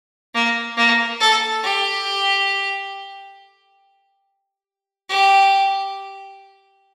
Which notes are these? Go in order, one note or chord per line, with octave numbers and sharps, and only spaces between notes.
A#3
A#3
A4
G4
G4